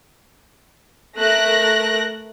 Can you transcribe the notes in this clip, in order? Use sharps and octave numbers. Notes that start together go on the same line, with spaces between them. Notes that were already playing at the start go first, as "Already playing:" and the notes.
A3 A#4 F#6 A#6